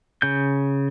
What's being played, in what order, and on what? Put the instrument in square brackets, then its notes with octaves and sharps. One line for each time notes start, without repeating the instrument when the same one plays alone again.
[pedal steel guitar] C#3 G6